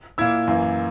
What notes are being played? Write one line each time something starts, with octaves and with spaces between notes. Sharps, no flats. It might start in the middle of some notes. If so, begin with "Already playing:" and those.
A#2 A#3 E4 E6 G#6
F#2 E3 A#3